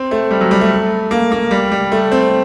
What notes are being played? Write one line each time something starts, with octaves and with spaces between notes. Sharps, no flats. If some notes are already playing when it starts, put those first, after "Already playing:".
Already playing: C4
A3
G3
F#3
G3
A3
A#3
A#3
G3
G3
A3
C4